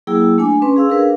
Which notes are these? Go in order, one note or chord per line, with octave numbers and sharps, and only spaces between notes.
F#3 A#3 E4 G#4 G5 E6
A3 D4 G#5 D6
C#4 B4 C6
G#4 F5 E6
D4 G#4 A#4 B4 F5